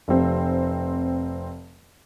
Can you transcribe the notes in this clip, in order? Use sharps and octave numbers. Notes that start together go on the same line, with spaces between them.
F1 C4